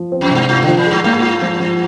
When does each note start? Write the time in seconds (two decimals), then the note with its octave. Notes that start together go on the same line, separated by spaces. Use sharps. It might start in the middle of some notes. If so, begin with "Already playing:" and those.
Already playing: F3
0.12 C4
0.21 F2
0.31 G2 C3
0.49 G2 F4
0.62 D3
0.68 F3
0.77 A#2
0.86 G2 G#4
1.04 G2 A#3
1.23 F4
1.42 F3
1.60 F3